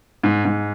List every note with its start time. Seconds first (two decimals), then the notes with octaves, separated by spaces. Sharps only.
0.24 G#2
0.45 G#2